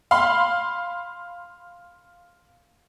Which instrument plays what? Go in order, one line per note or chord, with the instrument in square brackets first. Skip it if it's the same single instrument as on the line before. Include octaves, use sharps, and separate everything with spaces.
[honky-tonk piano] F5 B5 C6